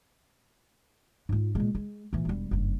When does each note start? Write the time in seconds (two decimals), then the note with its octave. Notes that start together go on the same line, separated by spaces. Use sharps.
1.29 G#2 F4
1.55 A#2 G#3
1.75 G#3
2.13 A#2 E3
2.25 E1 G3
2.51 F#1 G2